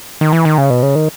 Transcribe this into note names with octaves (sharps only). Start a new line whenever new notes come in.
D#3
E3
D#3
C#3
B2
C#3
D#3